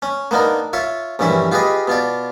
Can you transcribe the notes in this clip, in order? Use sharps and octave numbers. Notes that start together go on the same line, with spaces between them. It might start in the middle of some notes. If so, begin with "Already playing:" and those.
C#4
A#3 B3 D4 D#4 A#4
F4 C#5 E5
A#1 G2 E3 C#4 E5
F4 G4 G#4 B4 D#5
B2 F4 D5